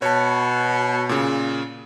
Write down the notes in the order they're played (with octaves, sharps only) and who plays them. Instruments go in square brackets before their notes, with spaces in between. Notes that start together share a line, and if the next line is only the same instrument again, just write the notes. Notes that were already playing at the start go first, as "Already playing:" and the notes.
[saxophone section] B2 [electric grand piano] C#5 A5
[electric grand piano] A#2 C#3